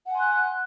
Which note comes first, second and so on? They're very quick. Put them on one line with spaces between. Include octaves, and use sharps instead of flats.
F#5 G#5 C6 F#6